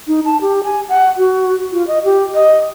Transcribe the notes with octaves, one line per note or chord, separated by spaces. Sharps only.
D#4
A5
G4
G#5
F#5
F#4
F4
D#5
G4
D#5